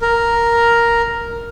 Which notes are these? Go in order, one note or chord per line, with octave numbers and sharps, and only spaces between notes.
A#4